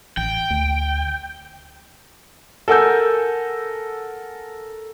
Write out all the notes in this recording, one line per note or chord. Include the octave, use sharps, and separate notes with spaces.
A1 G5
D2
A4 A#4 F#5 G#5 E6 G6